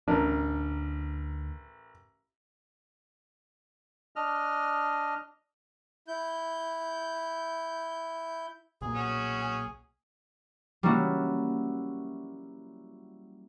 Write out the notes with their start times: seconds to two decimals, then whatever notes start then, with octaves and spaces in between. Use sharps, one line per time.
0.08 A1 D2 D4 A#4
4.16 D4 D#5 F6
6.08 E4 G6
8.81 B1 A#2 G#4
8.95 C#4 F#4
9.42 G#4
10.83 G3 A#3 C#4 E4 F#4